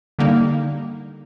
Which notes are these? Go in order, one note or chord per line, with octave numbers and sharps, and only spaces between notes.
D3 G3 A#3 D#4